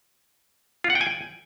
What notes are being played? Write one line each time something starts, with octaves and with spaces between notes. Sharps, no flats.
F4
F#5
G5
G#5
G5